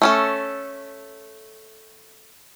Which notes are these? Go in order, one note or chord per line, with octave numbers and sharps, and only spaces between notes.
A3 C#4 A4